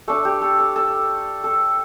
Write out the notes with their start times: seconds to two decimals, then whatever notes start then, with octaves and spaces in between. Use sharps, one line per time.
0.08 A3 D4 A4
0.25 G4
0.42 A4
0.59 A4
0.76 A4
1.44 A4